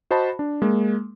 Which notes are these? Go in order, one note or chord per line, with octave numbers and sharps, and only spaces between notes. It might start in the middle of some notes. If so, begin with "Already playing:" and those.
F#4 C5 D#5 A5 B5
D4
G#3 A#3